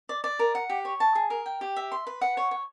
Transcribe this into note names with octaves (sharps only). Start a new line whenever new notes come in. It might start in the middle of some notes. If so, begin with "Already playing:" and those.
D5
D5
A#4
F#5
G4
C#5
A5
G#4
A#4
G5
G4
E5
C6
B4
F#5
C#5
C#5